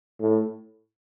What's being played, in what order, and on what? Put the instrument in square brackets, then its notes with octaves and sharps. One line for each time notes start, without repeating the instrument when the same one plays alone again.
[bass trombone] A2